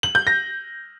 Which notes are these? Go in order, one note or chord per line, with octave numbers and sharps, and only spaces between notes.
F#7
G6
A#6